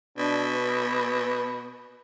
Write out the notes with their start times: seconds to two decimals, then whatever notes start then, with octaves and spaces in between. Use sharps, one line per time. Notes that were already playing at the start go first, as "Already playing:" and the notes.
0.18 B2 D4
0.55 B4